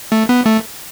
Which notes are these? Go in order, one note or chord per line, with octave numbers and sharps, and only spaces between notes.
A3
B3
A3